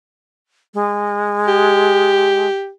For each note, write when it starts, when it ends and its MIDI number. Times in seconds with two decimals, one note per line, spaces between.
0.74 2.48 56
1.48 2.70 67